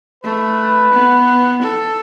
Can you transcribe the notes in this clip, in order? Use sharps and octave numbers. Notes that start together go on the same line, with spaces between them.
A3 B4
B3
A4